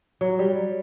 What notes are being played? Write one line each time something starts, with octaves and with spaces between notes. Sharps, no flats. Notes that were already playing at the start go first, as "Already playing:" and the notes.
F#3
G3